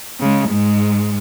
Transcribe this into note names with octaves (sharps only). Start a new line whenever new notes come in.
C#3 G#3
G#2 G#3